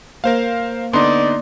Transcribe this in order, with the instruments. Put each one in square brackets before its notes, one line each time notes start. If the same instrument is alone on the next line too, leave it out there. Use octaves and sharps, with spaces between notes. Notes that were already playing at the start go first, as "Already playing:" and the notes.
[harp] A#3 [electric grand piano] A#4 C5 F5
[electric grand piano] D3 B3 [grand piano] D#4 C6 [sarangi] D5